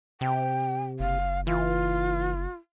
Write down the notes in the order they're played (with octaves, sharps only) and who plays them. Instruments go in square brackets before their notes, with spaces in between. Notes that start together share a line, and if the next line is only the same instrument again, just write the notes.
[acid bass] C3 [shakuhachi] G5
[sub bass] F#1 [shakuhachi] F5
[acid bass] E3 [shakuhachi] F4